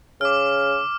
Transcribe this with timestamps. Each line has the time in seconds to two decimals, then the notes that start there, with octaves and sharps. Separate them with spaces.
0.21 C#3 D6 F6